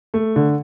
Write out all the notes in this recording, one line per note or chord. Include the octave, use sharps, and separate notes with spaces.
A3
D3